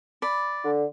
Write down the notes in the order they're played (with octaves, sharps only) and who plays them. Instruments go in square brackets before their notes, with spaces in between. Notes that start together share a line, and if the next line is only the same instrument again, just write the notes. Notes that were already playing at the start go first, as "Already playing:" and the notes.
[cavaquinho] D5 B5
[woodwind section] D3